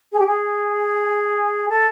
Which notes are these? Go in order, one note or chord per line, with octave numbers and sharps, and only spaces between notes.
G#4
G4
G#4
A4